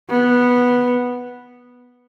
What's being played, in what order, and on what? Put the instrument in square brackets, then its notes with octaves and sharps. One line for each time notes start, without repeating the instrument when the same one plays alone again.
[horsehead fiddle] B3